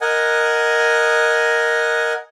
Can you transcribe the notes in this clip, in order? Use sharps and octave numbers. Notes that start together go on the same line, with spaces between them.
A#4 D#5 F#5 G#5